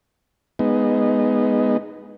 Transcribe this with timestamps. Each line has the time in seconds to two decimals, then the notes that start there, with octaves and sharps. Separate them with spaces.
0.59 G#3 B3 D#4